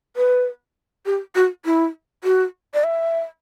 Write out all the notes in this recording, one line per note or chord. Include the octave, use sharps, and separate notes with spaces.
B4
G4
F#4
E4
F#4
D5
E5